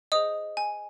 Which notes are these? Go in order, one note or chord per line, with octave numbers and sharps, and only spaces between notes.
G#4 C5 D#5 D#6
G#5